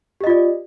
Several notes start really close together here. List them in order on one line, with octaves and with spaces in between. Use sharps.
G4 D#5 F4 D5